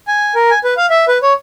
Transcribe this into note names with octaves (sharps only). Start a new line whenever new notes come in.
G#5
A#4
G#5
B4
F5
E5
B4
C#5